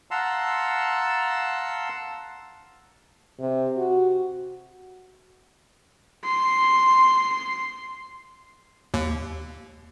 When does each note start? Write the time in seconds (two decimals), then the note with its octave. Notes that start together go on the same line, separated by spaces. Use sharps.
0.11 F5 F#5 A5 A#5 C6 E6
3.39 C3
3.77 F#4
6.24 C6
8.94 D#2